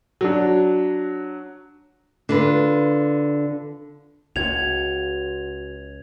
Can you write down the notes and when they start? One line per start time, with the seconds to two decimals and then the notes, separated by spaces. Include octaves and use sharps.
0.21 F#3 D4
2.29 D3 F4 B4
4.36 C#2 F#4 G#6 F7